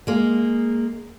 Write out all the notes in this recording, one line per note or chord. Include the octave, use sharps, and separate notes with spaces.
G#3 A#3